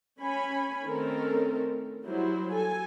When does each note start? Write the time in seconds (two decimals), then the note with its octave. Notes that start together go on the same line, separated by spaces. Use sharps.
0.20 C#4 C#5 G#5 B5
0.86 D#3 A3 C4 C#4 A4 A#4
2.05 F#3 G3 E4 C5
2.51 A4 G#5